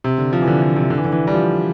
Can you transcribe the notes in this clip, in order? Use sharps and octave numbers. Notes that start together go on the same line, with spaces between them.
C3
D3
F3
E3
D3
D3
C3
D3
E3
D3
E3
G3
F3